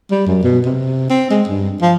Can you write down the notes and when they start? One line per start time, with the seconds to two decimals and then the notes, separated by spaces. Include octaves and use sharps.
0.11 G3
0.27 F#2
0.43 B2
0.65 C3
1.10 C4
1.30 G#3
1.48 G2
1.82 F3